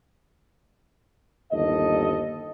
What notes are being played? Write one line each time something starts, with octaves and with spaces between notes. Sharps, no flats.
G1 D#2 A4 D#5